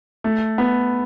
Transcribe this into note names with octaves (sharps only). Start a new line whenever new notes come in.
A3
B3